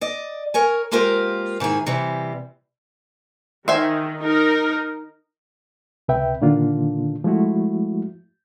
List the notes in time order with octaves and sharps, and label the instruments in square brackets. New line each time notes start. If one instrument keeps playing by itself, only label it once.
[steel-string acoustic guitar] D5 D#5
A#4 C#5 G#5
G#3 A#3 F4 G4 A#4 C5
G#2 D#3 E4 G#4
C3 E3 G3 C4
[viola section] D#3 [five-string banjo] C5 E5 G#5
[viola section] D#4 A#4
[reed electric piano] C#2 C3 B4 E5 G5
A#2 D3 D#3 A#3 D4 F4
F3 G#3 A3 E4 F#4